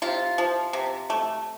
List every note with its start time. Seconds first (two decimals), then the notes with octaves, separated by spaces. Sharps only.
0.02 C3 F4
0.38 F3
0.73 C3
1.10 A3